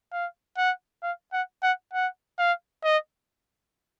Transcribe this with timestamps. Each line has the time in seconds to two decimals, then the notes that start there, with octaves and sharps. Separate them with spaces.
0.13 F5
0.58 F#5
1.03 F5
1.33 F#5
1.63 F#5
1.93 F#5
2.39 F5
2.84 D#5